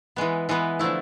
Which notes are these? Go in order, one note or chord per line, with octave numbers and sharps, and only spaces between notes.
E3 G#3 B3
E3 G#3 B3
D3 F3 A3 E4